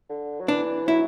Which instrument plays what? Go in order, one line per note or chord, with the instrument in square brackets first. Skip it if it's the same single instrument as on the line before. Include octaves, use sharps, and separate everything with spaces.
[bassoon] D3
F#3
[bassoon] E3 [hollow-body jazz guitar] D4
[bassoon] F#3 [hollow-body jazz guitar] E4